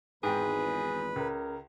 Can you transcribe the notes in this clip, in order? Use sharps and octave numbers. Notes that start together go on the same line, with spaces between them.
G#1 E2 G#2 G#4 B4 G5
C#2 C#3 A#4